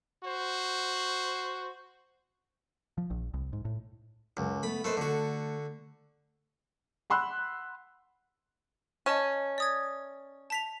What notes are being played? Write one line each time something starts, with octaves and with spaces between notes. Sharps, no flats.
F#4 C5
F3
A#1
C2
G#2
A2
C#2 F#2
A3 B3 B5
A3 A#3 B4 C5 D#5
D3 A3 F#4
F#5 B5 C6 E6 F#6
C#4 D#5 A5 D#7
D5 D#6 G#6
A5 B6 F7